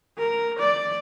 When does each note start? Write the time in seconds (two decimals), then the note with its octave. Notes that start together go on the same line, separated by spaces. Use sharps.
0.18 A#4
0.59 D5